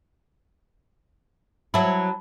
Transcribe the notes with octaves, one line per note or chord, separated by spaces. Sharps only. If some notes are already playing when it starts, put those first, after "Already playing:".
F#3 E4 A5 B5